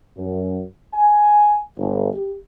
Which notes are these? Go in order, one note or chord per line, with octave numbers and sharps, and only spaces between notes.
F#2
G#5
G1
G4